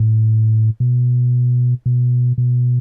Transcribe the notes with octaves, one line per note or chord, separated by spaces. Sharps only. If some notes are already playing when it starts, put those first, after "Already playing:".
Already playing: A2
B2
B2
B2